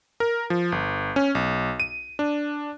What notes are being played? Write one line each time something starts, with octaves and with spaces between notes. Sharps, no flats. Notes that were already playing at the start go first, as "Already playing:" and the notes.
A#4
F3
G1
C#4
B1
D#7
D4